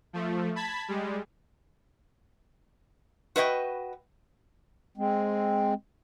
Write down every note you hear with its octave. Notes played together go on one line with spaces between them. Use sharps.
F3 A3
A5 B5 G#6 B6
G3 G#3
F#4 B4 D#5 G5
G#3 C4